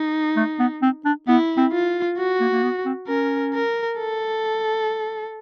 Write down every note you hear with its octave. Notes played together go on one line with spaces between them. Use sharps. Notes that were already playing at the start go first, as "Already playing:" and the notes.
Already playing: D#4
A3
B3
C4
D4
B3 E4
C4
F4
F#4
A#3
A#3
B3
C4
C#4 A#4
A#4
A4